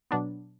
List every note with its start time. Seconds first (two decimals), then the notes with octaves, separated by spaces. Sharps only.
0.11 B2 F#3 B3 D4